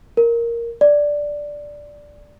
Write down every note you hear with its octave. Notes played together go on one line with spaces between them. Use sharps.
A#4
D5